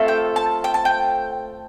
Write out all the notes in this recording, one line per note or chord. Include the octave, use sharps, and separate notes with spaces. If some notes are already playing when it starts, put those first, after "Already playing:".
Already playing: A3 C4 F4 A4
G5
A5
G5
A5
G5